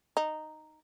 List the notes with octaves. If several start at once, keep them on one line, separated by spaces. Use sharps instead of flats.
D#4